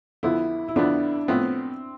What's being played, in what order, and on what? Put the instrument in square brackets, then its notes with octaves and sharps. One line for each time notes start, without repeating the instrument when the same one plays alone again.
[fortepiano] F2 D3 F3 B3 [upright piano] E4
[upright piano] E4
[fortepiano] F2 D3 F3 B3 [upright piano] D4
[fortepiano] A2 F3 B3 [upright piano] C4